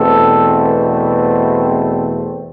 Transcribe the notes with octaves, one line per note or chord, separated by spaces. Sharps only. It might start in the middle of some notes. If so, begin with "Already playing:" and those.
Already playing: E2 B2 A3 C4 A4